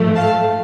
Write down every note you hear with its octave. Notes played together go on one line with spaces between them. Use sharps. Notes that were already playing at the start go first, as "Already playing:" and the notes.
Already playing: G#2 F3 A3
F5 A5